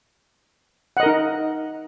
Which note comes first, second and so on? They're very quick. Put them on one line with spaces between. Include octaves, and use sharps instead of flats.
F#5 D#5 A#4 D#4